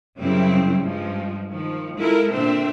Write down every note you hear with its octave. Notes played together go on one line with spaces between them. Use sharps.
F#2 C#3 G3 C4 E4
G2 F3 G#3
D#3 F3
G#3 E4 F4 A4 A#4
A#2 D3 C4 D4 C5 E5